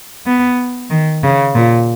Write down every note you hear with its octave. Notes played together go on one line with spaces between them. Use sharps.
B3
D#3
C#3
A#2